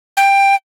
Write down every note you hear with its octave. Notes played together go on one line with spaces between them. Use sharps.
G5